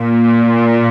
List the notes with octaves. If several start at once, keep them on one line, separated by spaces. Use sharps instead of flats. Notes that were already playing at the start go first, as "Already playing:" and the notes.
Already playing: A#2